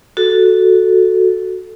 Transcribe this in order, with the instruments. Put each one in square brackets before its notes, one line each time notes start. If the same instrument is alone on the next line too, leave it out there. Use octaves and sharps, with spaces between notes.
[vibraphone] F#4 A4